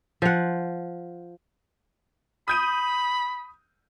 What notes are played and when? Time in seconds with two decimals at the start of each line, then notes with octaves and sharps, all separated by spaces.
0.22 F3 F#5
2.48 B5 D#6 G6 D#7